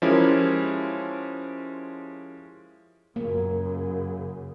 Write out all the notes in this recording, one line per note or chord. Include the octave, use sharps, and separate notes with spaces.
F3 G#3 C#4 E4 G4 A#4
F#2 C#3 A#3